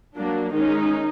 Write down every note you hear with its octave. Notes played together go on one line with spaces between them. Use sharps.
F#3 A#3 D4
D#3 G#3 C#4 D#4